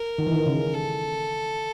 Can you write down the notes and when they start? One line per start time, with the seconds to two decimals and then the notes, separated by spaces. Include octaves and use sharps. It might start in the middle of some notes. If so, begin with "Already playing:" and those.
Already playing: A#4
0.19 D#3
0.27 E3
0.33 D#3
0.46 C#3
0.73 A4